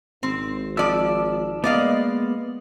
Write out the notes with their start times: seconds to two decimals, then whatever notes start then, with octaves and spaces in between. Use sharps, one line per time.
0.23 G#1 C4
0.77 F3 D5 E6
1.64 G#3 A#3 B3 D5 D#5 F5